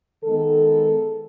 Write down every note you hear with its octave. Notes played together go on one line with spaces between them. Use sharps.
D#3 G#3 B3 A4